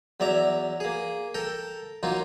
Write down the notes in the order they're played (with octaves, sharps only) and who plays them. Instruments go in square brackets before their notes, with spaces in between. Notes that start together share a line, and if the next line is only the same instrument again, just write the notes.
[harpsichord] E2 F#3 D5 E5 A#5
A#3 G#4
A4 A#4 G5
F#3 A#3 D#4 F4